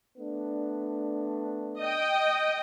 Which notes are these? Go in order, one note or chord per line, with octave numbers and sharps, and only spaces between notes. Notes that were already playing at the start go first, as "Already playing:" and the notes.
A3 B3 D4
D#5 G5